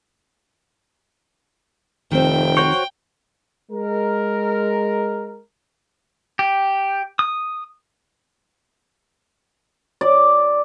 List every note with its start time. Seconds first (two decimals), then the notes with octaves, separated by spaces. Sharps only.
2.11 F1 D#3 C4 G5
2.57 F#4 C5 C#5
3.71 G#3 A#4
6.39 G4
7.19 D#6
10.01 D5